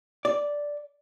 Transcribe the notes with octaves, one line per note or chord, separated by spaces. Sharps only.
D5